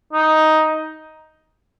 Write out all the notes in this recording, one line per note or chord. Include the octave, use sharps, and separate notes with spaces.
D#4